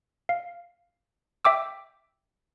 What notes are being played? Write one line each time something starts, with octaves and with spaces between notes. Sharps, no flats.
F5
E5 G5 D6 E6